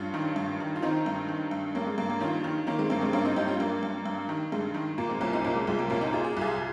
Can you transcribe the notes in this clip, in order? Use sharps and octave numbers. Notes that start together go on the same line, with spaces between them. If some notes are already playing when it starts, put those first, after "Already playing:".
Already playing: G2 C#4 F4
D#3
G2
D#3
F4
D#3 C4 D#4
G2
D#3
G2
G2 A#3 C#4
G#3
G2 A#3
A#3
D#3 C#4 F4
D#3
D#3 A#3 C#4
G#3 C4
G2 A#3
G#3 C4
G2 A#3 C#4
C4 D#4
G2 D#4 G4
C#4 F4
G2 A#3
G2
G2
D#3
G2 G#3
D#3
A#2 A#3
G#3 C4
C2 A#3 C#4
C4 D#4
A#2 A#3 C#4
G#3 C4
C2 G#3
A#3
A#2 A#3 C#4
C4 D#4
A#2 F4 G#4
G#4
C2 F4 G#4